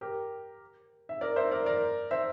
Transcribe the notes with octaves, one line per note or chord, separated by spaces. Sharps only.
G4 A#4
E5
A#4 D5
C5 E5
A#4 D5
A#4 D5
C5 E5